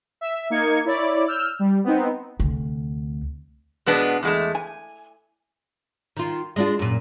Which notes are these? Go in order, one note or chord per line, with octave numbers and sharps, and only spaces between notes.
E5
A#3 D#4 G#6 C#7
E4 C#5 D5
E6 F6 G6
G3
B3 C4 D#4
D2 C3
B2 G#3 B3 D4
E2 G#3 A3
G#5
D#3 F4
G#3 D4 F4
F#2 A#2